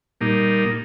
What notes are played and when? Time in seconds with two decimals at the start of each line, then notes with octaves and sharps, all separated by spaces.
0.21 A#2 G3 A#3 D#4